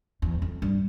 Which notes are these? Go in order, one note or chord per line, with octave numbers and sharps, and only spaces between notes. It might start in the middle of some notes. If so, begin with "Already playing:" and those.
E2
F2
G2